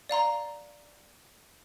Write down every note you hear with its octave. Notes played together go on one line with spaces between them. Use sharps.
D5 F5 A#5 C6